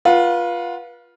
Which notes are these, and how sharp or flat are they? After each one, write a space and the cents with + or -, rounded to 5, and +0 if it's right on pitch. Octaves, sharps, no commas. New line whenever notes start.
F4 +0 B4 -35 F#5 +0